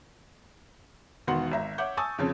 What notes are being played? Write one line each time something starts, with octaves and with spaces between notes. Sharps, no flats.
E1 D#3 B3 F#4 F#5 C6
G#1 E5 A#5
C#5 E5 F#5 D6 G6
G#5 A5 C#6 D#6 E6 A6
F2 C#3 F3 C#4 A5